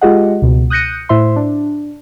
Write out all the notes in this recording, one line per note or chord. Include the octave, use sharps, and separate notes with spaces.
G#3 F4 G4 G#4 D#5 F#5
C#2 B2
D#6 F#6 G6 A#6 C#7 D#7
A2 E4 C5 E5 C6
D4